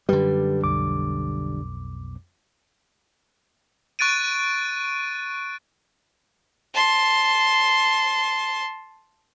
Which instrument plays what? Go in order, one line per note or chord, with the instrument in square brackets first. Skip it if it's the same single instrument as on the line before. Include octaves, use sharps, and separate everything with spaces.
[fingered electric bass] F#2 [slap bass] D3 G3 [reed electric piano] G4 B4
[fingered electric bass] B1 [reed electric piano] F2 D6
[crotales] C#6 F#6 A6 D7 D#7
[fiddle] A5 C6